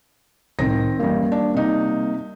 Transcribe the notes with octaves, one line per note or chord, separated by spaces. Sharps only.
C2 A2 D#3 C4 A#6
A1 F#2 G3 A#3
D4
C3 D#4